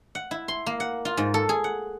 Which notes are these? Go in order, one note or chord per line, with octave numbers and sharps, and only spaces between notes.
F#5
E4
C6
A#3
F#5
F4
G#2
A4
G#4
F#5